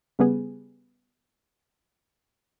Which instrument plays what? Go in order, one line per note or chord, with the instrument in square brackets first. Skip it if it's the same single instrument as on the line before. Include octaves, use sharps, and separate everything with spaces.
[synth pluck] C#3 G3 B3 G#4